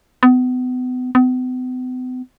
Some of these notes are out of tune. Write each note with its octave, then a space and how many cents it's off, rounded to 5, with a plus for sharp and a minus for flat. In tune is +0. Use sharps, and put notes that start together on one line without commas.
B3 +35
B3 +45